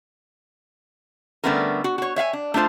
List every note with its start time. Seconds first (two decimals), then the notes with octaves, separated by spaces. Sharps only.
1.44 D3 G3 A3 B3 C#4 A#4
1.84 F#4
1.98 F#4 C#5
2.16 C#5 E5 F5 G#5
2.33 D4
2.54 A3 D4 F4 C5